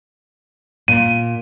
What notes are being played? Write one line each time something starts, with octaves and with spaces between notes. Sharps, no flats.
A#2 D#7